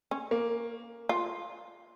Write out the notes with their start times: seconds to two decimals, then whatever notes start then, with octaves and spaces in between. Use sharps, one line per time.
0.11 C#4
0.31 A#3
1.09 F4